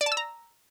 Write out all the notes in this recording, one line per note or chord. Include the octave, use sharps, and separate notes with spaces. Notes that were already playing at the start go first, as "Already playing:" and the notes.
D5
A5
E6
A#5